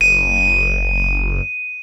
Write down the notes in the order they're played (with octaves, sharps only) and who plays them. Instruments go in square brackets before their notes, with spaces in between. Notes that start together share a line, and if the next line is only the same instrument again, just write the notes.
[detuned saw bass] F#1 [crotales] D#7